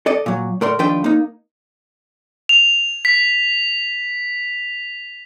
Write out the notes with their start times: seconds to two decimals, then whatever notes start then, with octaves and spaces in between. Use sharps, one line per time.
0.06 A4 D5 D#5
0.26 A#2 F#3
0.61 A2 A#4 D5 C6
0.79 D#2 F3 D4 B4 G5 C6
1.04 A#3 D#4
2.49 F7
3.05 B6